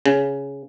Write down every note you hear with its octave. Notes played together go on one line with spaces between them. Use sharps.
C#3